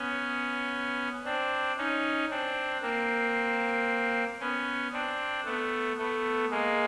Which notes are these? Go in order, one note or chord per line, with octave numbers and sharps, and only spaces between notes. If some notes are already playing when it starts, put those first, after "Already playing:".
Already playing: B3 C#4
C4 D4
C#4 D#4
C4 D4
A#3 C4
B3 C#4
C4 D4
A3 B3
A3 B3
G#3 A#3